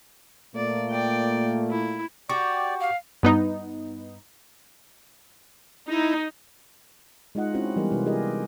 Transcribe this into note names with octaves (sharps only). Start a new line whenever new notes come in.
A#2 A3 A#3 D5
D5 G5
E4
F#4 G4 D5 C#6
F5
G2 B3 D#4
D#4 E4
G#3 D#4 F4 D#5 F#5
C4 C#4 E4 F#4 C5
E3 G3 G#3 B3 G4 A#4
C3 E4 B4
E4 F4 G4 G#4 A#4 D#5